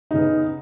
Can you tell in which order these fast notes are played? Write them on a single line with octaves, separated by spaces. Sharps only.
D#4 C#3 B3